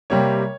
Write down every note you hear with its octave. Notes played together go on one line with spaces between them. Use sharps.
C3 G3 A#3 C#5